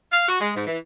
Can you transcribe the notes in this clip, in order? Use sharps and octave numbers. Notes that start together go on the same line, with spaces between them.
F5
F#4
G#3
G#2
E3